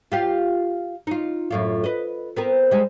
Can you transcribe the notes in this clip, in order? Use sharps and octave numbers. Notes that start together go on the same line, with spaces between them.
F4 G4 F5
D#4 F4
F#2 A2 F4
B4 D#5
B3 C4 A#4
G3 G#3